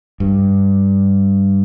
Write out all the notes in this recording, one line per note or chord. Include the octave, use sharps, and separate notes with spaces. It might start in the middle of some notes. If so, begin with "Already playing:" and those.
G2